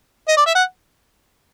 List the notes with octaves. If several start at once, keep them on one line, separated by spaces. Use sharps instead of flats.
D#5
D5
E5
F#5